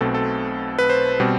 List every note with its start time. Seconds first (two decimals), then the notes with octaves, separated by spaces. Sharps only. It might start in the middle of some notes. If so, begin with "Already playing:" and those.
0.01 B1 B2 A3 C4 A4
0.15 A4
0.79 B4
0.90 C5
1.20 B2 G3 C4